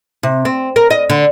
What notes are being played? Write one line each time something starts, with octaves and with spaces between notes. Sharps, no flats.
C3
C4
A#4
D#5
D3